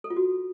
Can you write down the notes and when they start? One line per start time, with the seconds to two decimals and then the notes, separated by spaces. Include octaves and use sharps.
0.04 A4
0.10 F4
0.17 F#4